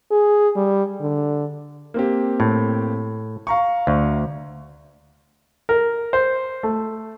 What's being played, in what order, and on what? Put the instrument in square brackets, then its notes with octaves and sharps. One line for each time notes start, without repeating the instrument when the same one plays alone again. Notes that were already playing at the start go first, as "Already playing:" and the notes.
[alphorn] G#4
G3
D3
[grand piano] A#3 C4 G4
[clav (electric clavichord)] A2
[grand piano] F5 A#5 C#6
[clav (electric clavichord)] D2
[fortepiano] A#4
C5
A3